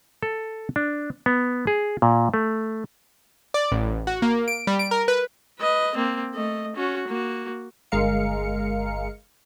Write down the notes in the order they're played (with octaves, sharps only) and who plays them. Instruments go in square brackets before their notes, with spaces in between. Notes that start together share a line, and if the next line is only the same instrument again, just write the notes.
[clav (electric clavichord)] A4
D4
B3
G#4
A#2
A3
[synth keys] D5
A1
F#4
A#3
D7
G3
D7
A#4
B4
[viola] B4 D#5
A#3 C4
A3 D#5
C#4 F#4
A#3 F#4
[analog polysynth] G1 G#3 A#4 F5 C#7